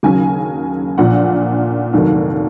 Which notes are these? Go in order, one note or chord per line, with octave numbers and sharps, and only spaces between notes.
D#2 C#3 F#3 G#5
A#1 A#2 F3 F#5
F1 D#2 D#3 F#3